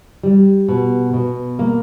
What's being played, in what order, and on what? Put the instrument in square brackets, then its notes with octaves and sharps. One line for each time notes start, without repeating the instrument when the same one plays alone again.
[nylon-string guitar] G3
B2
B2
A#3